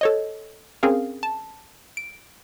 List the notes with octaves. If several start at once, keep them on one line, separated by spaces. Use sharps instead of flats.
A4 C#5 D#5
C4 C#4 G#4 A#4 F5
A5
D7